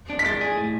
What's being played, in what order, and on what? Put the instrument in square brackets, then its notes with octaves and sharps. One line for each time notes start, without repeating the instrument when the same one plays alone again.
[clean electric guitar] D4
[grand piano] B6
[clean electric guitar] G#3 [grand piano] A6
[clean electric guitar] G#4
A2